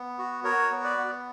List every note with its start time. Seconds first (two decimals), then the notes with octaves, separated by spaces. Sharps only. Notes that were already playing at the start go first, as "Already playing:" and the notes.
Already playing: B3
0.19 F#4
0.44 F#4 A#4 C#5
0.71 B3
0.84 B4 D5
0.98 B3